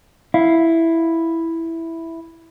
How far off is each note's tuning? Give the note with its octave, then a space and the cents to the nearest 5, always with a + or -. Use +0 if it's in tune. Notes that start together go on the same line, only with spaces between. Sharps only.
E4 +0 F5 +0